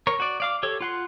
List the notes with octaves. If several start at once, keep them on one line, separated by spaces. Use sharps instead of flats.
A#4 C#5
F#4 D5
D5 F5 D6
G4 A4 C#5
F4 F#5 C6